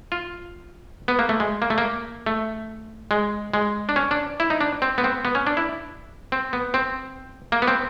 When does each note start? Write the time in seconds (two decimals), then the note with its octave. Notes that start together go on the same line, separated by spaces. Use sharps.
0.12 F4
1.08 B3
1.19 A#3
1.29 A3
1.40 G#3
1.62 A#3
1.70 A3
1.78 A#3
2.26 A3
3.11 G#3
3.54 G#3
3.89 D4
3.96 C#4
4.11 D4
4.40 E4
4.50 D#4
4.61 D4
4.82 C4
4.98 B3
5.04 C4
5.25 B3
5.35 C#4
5.47 D4
5.57 E4
6.32 C4
6.53 B3
6.74 C4
7.52 A#3
7.62 B3
7.67 C4